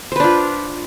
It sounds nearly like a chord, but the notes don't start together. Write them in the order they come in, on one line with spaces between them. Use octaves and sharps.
C5 B4 D4 F4